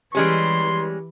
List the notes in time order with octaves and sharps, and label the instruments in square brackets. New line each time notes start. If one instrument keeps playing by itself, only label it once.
[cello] E3 [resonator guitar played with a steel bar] G3 G#3 C#4 [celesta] G4 [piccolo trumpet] C6